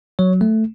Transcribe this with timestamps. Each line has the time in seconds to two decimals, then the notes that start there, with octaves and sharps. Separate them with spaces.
0.19 F#3 C#5
0.41 A3